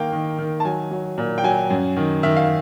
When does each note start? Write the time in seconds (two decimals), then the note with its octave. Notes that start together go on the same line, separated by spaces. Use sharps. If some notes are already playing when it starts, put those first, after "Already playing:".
Already playing: D#3 A#3 F5 G5
0.13 D#3
0.39 D#3
0.60 A5
0.65 F#3 G#5
0.91 F#3
1.18 A#2
1.38 G5
1.44 F#3 G#5
1.70 F#2
1.97 D#3
2.23 D#3 E5
2.37 F5